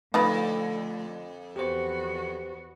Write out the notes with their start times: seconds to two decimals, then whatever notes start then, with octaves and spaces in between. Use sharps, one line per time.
0.14 F2 D3 A3 D#4 F4 B4
1.56 E2 B3 F#4 G4 C5